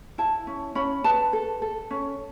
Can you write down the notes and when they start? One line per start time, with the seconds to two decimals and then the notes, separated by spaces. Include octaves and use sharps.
0.18 E4 A5
0.47 C#4
0.75 C#4 B5
1.04 B4 A5
1.33 A4
1.62 A4
1.91 C#4